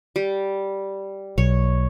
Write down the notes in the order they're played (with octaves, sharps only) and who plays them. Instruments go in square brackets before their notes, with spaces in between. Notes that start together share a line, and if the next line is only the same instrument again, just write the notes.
[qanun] G3
[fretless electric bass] B1 [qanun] C#5